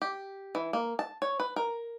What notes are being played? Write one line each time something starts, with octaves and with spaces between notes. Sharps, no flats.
G4
E3
A#3
A5
C#5
B4
A#4